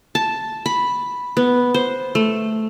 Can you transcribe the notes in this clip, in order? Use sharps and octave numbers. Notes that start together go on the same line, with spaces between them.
A5
B5
B3
C5
A3